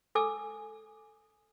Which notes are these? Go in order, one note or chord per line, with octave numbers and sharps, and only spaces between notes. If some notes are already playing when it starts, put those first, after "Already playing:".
A4 G#5 D6 E6